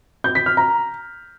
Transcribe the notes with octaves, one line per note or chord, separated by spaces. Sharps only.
G6
B6
F6
A#5